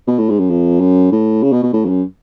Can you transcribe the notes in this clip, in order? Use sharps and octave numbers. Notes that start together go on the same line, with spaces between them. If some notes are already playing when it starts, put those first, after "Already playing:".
B2
A2
G#2
F#2
F2
F#2
A2
C#3
B2
B2
A2
F2
F#2